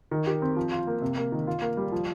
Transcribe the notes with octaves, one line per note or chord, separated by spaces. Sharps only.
D#3
G4
C4
F3
F4
A#3
C3
A#3
D#3
F4
A#3
G3
F3